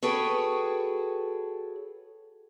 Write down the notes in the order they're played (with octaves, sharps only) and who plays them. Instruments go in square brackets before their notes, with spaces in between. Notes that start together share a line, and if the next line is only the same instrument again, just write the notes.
[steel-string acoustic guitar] F#4 G#4 A4 B4 C#5 G5